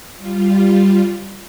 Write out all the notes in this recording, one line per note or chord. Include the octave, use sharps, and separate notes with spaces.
G3 F4